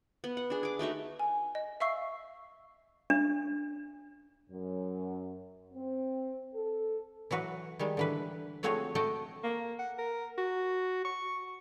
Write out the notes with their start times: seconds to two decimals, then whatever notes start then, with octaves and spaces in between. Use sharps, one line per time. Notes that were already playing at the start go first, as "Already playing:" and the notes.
0.24 B3
0.37 F#5
0.50 D4 G#4
0.63 G#4 D6
0.79 A3 D#4 F#4 E5
1.20 G#5
1.55 D#5
1.81 E5 F5 C#6 E6 C7
3.10 D4
4.50 F#2
5.73 C4
6.54 A4
7.31 E3 F#3 F#4 B4
7.79 D#3 G3 G#3
7.97 D3 E3 B4
8.63 F3 A3 C4 F#4 G#4 C#5
8.95 A3 F#4 D#5 G5 A5
9.43 A#3
9.79 F#5
9.98 A#4
10.38 F#4
11.05 C#6